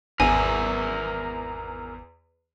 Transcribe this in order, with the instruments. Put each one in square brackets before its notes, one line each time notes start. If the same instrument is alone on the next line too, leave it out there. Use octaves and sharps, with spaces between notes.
[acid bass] G#1 [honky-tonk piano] E2 [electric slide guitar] A#4 E5 [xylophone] G#5